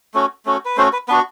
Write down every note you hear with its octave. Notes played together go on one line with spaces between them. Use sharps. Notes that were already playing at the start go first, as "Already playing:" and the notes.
A3 C#4 F#4
A3 C#4 F#4
B4
A3 C#4 F#4 C5
B4
B3 D4 F#4 B4